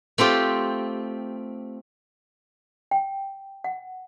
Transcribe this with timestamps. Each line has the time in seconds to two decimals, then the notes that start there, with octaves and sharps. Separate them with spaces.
0.18 A3 C4 F4 G4
2.91 G5
3.64 F#5